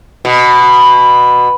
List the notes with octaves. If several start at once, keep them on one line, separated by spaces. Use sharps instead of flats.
B2